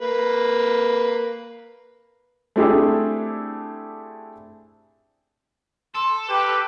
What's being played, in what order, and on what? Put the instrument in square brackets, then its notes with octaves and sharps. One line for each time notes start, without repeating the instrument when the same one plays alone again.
[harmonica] A#3 B4
[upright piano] A3 C4 D4 E4 G4 G#4
[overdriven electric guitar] A4 [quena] C6
[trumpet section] G4 B4 [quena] D6